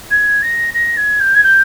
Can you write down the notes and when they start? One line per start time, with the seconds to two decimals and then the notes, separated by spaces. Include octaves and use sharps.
0.11 G#6
0.43 A#6
0.74 A#6
0.97 G#6
1.20 G6
1.35 G#6
1.44 G6